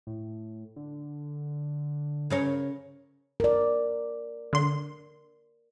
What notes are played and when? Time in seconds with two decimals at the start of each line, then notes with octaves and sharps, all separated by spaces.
0.07 A2
0.76 D3
2.30 C#3 A#4 C#5
3.40 A#4 D5
4.53 D3 C6